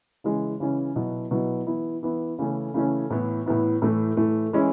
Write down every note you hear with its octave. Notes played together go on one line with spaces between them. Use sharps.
C#3 E3 G#3 C#4
C#3 E3 G#3 C#4
B2 F#3 B3 E4
B2 F#3 B3 E4
E3 B3 E4
E3 B3 E4
C#3 E3 A3 C#4
C#3 E3 A3 C#4
A2 E3 B3 E4
A2 E3 B3 E4
A2 E3 A3
A2 E3 A3
E3 G#3 C#4 E4